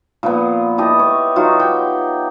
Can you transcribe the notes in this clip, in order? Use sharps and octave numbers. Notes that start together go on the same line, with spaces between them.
A#2 F3 B3
E4 G4 D#5 A5
C#5
F#3 D#4 F4 F#4
G4 G5